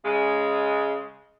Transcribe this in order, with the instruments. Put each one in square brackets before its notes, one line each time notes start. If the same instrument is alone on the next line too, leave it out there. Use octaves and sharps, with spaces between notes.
[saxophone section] C#3 G#3